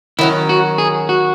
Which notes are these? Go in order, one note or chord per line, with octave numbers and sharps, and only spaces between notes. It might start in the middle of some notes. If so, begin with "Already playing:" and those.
D#3 F#3 C#4 E4
F#4
G#4
F#4